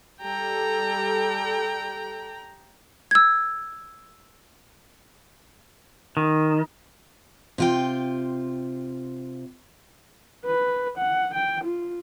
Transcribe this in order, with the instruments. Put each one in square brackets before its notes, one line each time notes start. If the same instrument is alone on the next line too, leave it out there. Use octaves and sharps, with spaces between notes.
[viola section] G3 A4 [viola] G5 A#5
[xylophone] E6 G#6
[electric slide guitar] D#3
[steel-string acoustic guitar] C3 F4 G5
[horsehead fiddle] B4
F#5
G5
F4